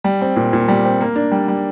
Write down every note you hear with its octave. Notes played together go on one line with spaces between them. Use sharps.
G3
C4
A#2
A#2
G3
C4
A#3
D4
G3
G3